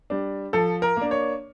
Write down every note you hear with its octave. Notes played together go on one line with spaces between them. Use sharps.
G3 D4
F3 A4
A#4
A#3 D4
C#5